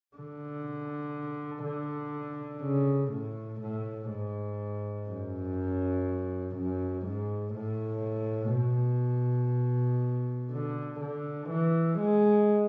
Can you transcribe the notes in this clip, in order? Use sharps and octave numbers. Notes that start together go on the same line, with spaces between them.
D3
D3
C#3
A2
A2
G#2
F#2
F#2
G#2
A2
B2
D3
D3
E3
G#3